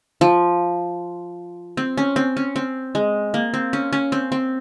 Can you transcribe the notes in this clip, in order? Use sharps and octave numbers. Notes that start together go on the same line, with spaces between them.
F3
C4
C#4
C4
C#4
C4
G#3
A#3
C4
C#4
C#4
C4
C4